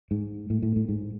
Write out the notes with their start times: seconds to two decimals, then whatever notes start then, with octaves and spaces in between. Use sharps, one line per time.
0.11 G#2
0.50 A2
0.62 A2
0.76 A2
0.89 G#2